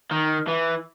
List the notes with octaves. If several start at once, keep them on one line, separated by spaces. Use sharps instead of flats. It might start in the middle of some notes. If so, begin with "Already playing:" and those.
D#3
E3